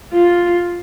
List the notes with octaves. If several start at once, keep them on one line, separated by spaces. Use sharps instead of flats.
F4